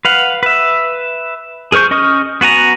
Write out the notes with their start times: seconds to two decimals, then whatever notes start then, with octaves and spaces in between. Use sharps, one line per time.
0.05 B4 F5 F#5
0.43 B4 E5
1.72 G#4 A#4 C5 C#6 G6
1.91 C#4 D#5 C#6 D#6 F6
2.41 B3 F#4 G#5 A#5